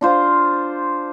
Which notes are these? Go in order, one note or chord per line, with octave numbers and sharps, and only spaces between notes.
D4 F4 C5